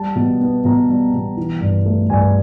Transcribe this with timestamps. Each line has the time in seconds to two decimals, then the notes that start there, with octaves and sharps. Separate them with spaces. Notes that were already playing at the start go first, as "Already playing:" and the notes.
Already playing: G3 A5
0.16 B2
0.41 B3
0.65 B2 A#5
0.89 G3
1.14 B2
1.37 E3
1.61 G2
1.86 A3
2.10 G2 G#5